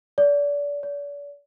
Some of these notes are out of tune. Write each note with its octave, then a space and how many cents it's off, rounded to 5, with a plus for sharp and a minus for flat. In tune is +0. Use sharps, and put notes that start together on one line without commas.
D5 -30
D5 -40